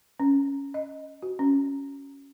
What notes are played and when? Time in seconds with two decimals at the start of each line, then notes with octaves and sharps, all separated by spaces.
0.20 C#4
0.74 D#5
1.22 F#4
1.39 C#4